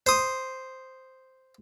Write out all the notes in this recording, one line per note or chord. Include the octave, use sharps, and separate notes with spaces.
C5 D#6